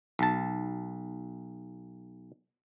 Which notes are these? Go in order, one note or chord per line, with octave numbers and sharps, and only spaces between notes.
B1 A5